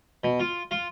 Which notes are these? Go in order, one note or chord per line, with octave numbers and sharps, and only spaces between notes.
B2
F4
F4